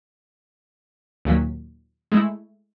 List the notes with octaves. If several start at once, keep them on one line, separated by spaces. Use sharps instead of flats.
D#2 A#2 F#3 B6
G#3 A3 E4